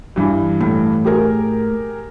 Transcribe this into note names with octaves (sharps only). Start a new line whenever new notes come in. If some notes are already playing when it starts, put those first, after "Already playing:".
G2 E3
A2
G4 G#4 A#4